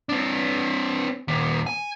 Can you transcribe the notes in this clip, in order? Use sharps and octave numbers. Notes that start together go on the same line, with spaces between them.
C4 D4
D#2 A#2
G#5